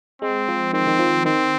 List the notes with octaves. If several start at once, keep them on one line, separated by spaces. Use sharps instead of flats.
G#3 C4
F3
D#3 C4
D#3
F3
D#3 C4